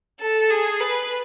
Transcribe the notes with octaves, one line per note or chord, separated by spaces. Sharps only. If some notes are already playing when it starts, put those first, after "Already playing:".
A4
G#4
B4